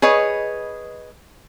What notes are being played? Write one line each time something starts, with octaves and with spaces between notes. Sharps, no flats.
G#4 B4 C#5 D#5